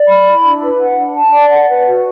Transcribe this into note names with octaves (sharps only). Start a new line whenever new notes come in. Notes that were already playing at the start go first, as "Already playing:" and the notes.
Already playing: D5
B5
E4
D4
B4
F#5
D4
A5
D5
F#5
B4
F#4